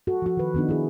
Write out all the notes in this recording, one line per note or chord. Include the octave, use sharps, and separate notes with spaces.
F#4 A4
F3 F#4
D#3 B4
D#3 B3 D4 D#4
E4 G#4